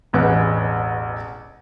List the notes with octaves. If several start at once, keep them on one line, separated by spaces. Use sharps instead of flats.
E1 A1 G#3 B4